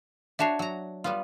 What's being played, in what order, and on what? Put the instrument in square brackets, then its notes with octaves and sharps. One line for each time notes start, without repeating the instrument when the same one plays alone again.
[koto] D4 F#4 C#5 [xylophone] E5 A5 C7
[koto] F#3 A#5
G3 B3 F4